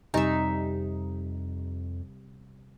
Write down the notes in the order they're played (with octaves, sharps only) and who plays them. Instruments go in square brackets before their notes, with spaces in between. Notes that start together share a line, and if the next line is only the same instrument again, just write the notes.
[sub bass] F2 [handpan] C3 G3 [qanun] D#4 E5 [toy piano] G4 D#5 G#5